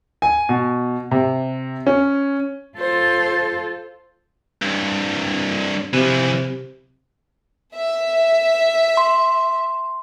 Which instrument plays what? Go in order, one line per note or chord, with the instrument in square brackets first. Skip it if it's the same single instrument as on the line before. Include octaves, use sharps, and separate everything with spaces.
[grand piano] G#5
B2
C3
C#4
[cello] F4 A4 [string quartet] C5
[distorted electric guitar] C2 G2
[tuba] C3 [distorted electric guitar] E3 F3
[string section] E5
[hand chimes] C6